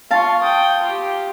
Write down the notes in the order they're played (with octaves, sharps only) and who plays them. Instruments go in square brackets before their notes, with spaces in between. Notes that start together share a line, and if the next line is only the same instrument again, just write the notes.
[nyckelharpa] F4 C#6 [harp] F5 A5
[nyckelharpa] G5 D#6
F4 G4